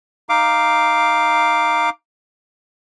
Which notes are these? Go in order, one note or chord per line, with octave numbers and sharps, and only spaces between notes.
D#4 F5 D6